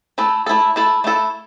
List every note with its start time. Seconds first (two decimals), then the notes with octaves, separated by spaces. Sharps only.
0.18 A3 E4 A4
0.46 A3 E4 A4
0.76 A3 E4 A4
1.04 A3 E4 A4